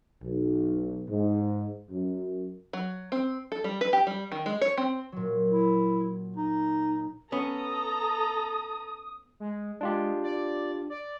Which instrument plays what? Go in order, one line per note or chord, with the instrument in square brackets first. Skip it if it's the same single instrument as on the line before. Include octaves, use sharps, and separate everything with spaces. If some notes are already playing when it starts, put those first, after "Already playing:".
[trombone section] B1
G#2
F#2
[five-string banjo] F#3
C4
A4
G3
B4
G4
G3
D#3
G#3
C#5
C4
[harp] A#2 F#3
[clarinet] E4
D#4
[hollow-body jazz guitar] B3 C#4 [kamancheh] A4 A#5 [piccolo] D#6
[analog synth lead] G#3
[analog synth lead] G#3 [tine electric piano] D4 F4 G4
[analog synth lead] D5
D5